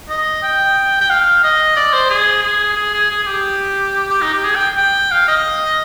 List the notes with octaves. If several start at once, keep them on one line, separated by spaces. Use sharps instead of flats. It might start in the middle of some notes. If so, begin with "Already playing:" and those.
D#5
G5
G5
F5
D#5
D5
C5
G#4
G#4
G#4
G#4
G#4
G#4
G4
G4
D#4
G4
G#4
G5
G5
F5
D#5